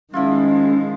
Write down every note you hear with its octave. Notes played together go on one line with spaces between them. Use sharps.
D#3 F3 G#3 C#4 E4 F4